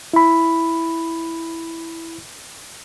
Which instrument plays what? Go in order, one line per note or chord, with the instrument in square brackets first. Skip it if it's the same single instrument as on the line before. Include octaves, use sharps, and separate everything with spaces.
[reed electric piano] E4 B5